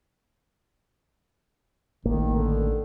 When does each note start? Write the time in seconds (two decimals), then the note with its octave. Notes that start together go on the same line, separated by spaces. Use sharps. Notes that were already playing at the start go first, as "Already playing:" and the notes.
2.05 A1 D#3 A#3
2.36 D3